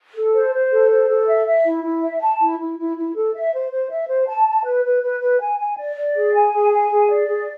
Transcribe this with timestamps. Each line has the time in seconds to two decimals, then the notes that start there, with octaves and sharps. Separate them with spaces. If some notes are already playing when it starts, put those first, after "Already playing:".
0.14 A4
0.33 C5
0.53 C5
0.71 A4
0.90 C5
1.09 A4
1.27 E5
1.47 E5
1.64 E4
1.83 E4
2.02 E5
2.21 A5
2.40 E4
2.59 E4
2.78 E4
2.96 E4
3.15 A4
3.34 E5
3.53 C5
3.71 C5
3.90 E5
4.09 C5
4.28 A5
4.47 A5
4.65 B4
4.84 B4
5.02 B4
5.21 B4
5.40 G#5
5.58 G#5
5.78 D5
5.97 D5
6.15 G#4
6.34 G#5
6.52 G#4
6.72 G#5
6.90 G#4
7.09 D5
7.28 G#4